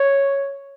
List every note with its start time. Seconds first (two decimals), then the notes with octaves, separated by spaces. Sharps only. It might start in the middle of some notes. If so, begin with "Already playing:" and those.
Already playing: C#5